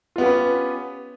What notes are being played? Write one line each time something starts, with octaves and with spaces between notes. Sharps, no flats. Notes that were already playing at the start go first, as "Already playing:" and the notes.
B3 C#4 F4 G4 B4